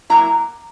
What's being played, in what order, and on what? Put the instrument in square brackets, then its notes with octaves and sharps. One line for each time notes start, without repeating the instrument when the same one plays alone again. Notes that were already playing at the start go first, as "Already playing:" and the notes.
[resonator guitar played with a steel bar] F#3 A#3 E4 A#5